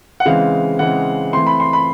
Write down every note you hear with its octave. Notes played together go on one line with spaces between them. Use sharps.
F#5
C#3 E3 G#3 C4 F5
C#3 E3 G#3 C4 F#5
E3 A3 C4 C6
B5
C6
B5